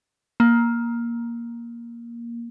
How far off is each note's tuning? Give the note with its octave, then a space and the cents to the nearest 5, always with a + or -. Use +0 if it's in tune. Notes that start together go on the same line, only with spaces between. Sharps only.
A#3 +10